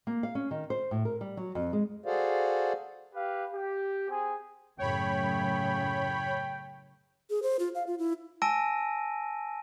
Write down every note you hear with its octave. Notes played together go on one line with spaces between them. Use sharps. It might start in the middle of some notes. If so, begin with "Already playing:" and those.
A#3
F5
C#4
D#3
C5
A2
A#4
G3
F#3
F2
G#3
F#4 G#4 A4 C5 D5 F5
G4 B4 F5
G4
C4 G#4 G#5
F#2 A2 C#3 C#5 G5 B5
G#4
C5
F4
F5
F4
E4
G#5 A5 E6 A#6 D7 D#7